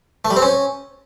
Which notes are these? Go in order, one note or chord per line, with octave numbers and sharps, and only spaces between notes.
A3
G3
C4
C#4